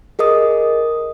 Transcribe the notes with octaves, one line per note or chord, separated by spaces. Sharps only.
G#4 A#4 D#5 D#6